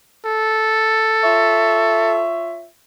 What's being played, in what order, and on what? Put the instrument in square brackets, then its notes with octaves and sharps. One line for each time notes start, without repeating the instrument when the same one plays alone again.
[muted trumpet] A4
[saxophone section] F4 C#5 E5